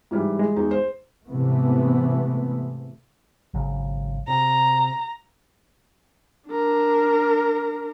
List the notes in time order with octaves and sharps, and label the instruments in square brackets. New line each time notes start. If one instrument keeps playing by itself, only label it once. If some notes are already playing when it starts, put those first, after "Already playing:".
[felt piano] G#2 E3 G3
[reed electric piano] G#3
[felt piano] E2 D#4
C5
[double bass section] G#2 C3 E3 A3 B3
[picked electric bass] G#1 C#3 F#3
[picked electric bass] C3 [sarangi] A#5
[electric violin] D4 A#4